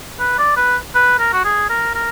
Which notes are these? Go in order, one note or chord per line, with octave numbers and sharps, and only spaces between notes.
B4
D5
B4
B4
A#4
F#4
G#4
A#4
A#4